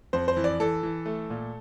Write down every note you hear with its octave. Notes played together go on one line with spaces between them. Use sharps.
F2 C5
C5
E3
D5
E3 A4
E3
A3
A#2